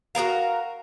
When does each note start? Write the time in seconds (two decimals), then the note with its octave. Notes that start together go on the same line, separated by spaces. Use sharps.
0.15 F#4 G#4 A#4 F5